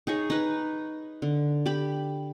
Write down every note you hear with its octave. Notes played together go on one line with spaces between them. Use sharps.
D#4 G#4 C#5
D#4 B4
D3
G4 B5